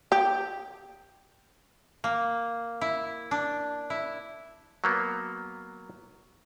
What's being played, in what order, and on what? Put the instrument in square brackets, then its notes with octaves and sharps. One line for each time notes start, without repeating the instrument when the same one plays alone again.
[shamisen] G4
[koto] A#3
E4
D4
E4
[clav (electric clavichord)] F#3 A#3 B3